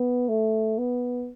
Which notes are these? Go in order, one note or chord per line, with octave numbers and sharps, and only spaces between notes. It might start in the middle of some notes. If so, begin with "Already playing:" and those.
Already playing: B3
A3
B3